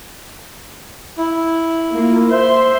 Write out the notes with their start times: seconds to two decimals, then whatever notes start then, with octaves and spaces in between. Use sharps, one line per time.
1.17 E4
1.93 A#3 F4
2.30 C5 E5 C6